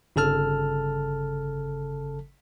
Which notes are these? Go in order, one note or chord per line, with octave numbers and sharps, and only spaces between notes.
G1 C#3 A4 A5 F6